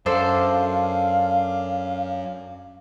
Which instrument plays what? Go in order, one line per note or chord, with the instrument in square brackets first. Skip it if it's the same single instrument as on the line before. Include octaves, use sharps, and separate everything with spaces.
[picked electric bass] F#2 [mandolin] D4 A4 C5 [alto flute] F5